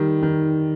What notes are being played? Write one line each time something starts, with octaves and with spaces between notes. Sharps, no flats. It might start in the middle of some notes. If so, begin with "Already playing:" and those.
Already playing: D#3 G3
D#3